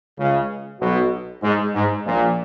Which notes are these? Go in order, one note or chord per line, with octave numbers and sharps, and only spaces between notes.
C#2 C#3
B1 B2
G#2
G#2
A#1 A#2